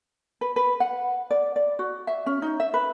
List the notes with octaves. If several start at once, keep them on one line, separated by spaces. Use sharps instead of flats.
B4
B4
F#5
D5
D5
F#4
E5
C#4
D#4
E5
B4